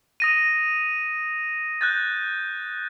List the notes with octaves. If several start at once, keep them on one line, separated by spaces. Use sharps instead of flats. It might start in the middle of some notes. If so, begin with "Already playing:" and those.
D#6 A#6 D#7
F#6 G6 A6